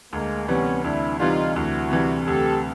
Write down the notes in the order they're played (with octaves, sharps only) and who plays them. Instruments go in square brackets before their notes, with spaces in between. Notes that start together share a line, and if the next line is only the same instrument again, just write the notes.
[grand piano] D2 [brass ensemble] G#3 A#3
[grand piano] C3 E3 G3 [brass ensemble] B3 C#4
[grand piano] D2 [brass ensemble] D4 E4
[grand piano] C3 E3 G3 [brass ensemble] D#4 F4
[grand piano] D2 [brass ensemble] E4 F#4
[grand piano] C3 E3 G3
[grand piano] D2 [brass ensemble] G4 A4